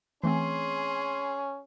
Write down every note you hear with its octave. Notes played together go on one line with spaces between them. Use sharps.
E3 A3 C4 C#4 G#4 C6